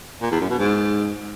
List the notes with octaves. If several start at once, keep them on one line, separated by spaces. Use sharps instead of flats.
A#2
E2
F#2
B2
G#2